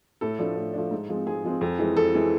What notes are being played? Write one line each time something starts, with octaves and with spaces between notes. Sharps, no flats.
A2 A4
F3 A3 D4
A2
F3 A3 D4
G#2
F3 G#3 C4
G#2 G#4
F3 G#3 C4
F2
E3 G#3
F2 A4
E3 G#3